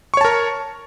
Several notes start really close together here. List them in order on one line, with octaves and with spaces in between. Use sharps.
C#6 C#5 A5 A#4